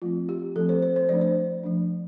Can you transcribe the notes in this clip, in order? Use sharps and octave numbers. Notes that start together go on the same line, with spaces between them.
F3 A3 C4 F4
G4
F3 A3 C4 A4
C5
C5
C5
F3 A3 D4 D5
C5
F3 A3 D4